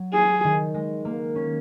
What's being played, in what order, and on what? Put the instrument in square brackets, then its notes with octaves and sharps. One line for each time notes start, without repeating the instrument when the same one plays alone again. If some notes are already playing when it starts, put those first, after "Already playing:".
Already playing: [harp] F#3
[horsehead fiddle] G#4
[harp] D#3
G#3
A#3
C#4